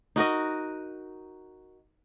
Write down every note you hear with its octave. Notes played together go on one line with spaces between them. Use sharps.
D#4 F#4 A#4 D#5